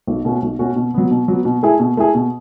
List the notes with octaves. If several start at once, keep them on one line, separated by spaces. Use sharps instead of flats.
B1
B2 A3 C#4 F#4
B1
B2 A3 C#4 F#4
B2
F#3 B3
B2
F#3 B3
B2
A3 E4 G#4
B2
A3 E4 G#4
B2